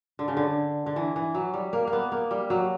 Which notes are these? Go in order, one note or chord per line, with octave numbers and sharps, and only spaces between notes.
D3
C#3
D3
D3
E3
E3
F#3
G3
A#3
A#3
B3
A#3
G3
F#3